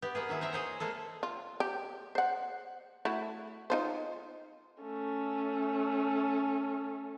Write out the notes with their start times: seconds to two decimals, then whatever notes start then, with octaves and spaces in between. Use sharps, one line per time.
0.02 B3 G4
0.15 A#3 B3 G#4
0.29 D#3 F#3 E4 G#4
0.41 C4 A#4 E5 A#5
0.53 G#4 C5 C#5
0.80 G#3 A#3 G#4 A4
1.23 F4
1.60 G4
2.15 C5 F#5
3.05 A3 E4 F#4
3.70 D#4 F4 C5
4.81 A3 C#4